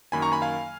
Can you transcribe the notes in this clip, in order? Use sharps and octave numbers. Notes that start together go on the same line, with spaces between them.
F#2 D#3 A#3 G#5 B5
A#5 C#6
G#5 B5
F5 G#5